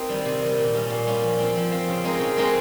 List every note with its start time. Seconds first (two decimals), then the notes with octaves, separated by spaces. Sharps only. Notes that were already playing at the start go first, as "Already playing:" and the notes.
Already playing: A#3 C4 D#4 G4
0.09 D#3 G3
0.25 C3
0.42 D#3 G3
0.58 A#2
0.74 G3 C#4 F4
0.90 A#2
1.07 G3 C#4 F4
1.23 F3
1.39 C4 F4
1.56 F3
1.72 C4 F4
1.88 C#3
2.04 G#3 C4 D#4 A#4
2.20 C#3
2.36 G#3 C4 D#4 A#4